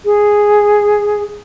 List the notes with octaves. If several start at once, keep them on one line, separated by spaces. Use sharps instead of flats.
G#4